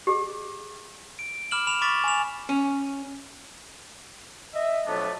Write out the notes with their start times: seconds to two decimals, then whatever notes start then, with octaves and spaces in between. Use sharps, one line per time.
0.07 G4 G#4
1.19 D7
1.51 B5 D6 F6 E7 F#7
1.67 B5 E7 F7
1.81 B5 C#6 D6 F6 A6 B6
2.04 G#5 F7
2.49 C#4
4.54 D#5 E5
4.87 F2 B2 F#3 A3 B3 D4